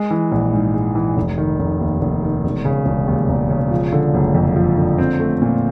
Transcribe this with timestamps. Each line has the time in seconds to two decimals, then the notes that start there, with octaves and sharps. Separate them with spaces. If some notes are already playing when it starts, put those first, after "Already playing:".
Already playing: G#3
0.11 E3
0.32 A#1
0.53 G#2
0.74 G#3
0.95 E3
1.17 F1
1.38 D#3
1.59 F1
1.80 D#2
2.01 F1
2.23 D#3
2.44 E1
2.65 C#3
2.86 E1
3.08 D#2
3.29 E1
3.50 C#3
3.71 F3
3.92 D3
4.14 F#1
4.35 F2
4.56 F3
4.77 D3
4.98 C4
5.19 A3
5.42 A#2